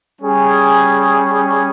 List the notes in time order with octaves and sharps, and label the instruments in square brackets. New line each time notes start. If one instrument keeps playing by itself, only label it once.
[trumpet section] G3 C#4 G#4